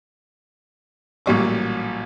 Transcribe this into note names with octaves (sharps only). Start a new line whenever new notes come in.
A1 A#2 F#3 G3 C#6 D6